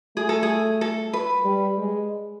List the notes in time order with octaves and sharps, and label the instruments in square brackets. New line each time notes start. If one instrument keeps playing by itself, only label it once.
[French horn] A3 [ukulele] G#4
[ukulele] A4
G#4
A4
B4
[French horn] G3
G#3